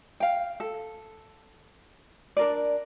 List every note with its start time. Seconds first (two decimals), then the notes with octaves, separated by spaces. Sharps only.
0.20 F5 G5
0.60 A4
2.37 D4 A#4 D5